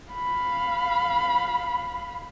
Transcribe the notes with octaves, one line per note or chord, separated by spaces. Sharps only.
F5 B5